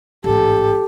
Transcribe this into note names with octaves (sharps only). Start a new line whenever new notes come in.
A1 G#2 G4 A4